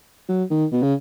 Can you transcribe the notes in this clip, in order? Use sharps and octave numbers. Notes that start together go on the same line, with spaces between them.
F#3
D#3
B2
C#3